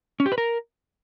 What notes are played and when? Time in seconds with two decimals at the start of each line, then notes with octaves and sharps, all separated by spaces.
0.20 C#4
0.26 G4
0.32 B4
0.38 A#4